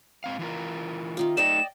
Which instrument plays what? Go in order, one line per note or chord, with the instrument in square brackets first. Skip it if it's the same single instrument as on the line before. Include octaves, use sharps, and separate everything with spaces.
[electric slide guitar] G#2 C4 F5
E3 F4 A#4
[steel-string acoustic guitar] C3 D#3 F4
[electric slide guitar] A3 D#4 [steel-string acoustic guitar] D5 D#5 G5 [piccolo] E7